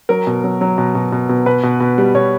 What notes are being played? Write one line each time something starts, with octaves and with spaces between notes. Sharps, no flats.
F#3 A#4
B2
F#3
F#3
B2
B2
B2
B2
B2 B4
B2
B2
G3
B2 C#5